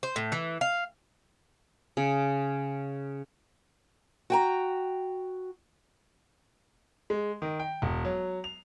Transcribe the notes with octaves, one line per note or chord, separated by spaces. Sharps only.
C5
A2
E3
F5
C#3
F#4 G5 A#5
G#3
D#3
G5
E1
F#3
F7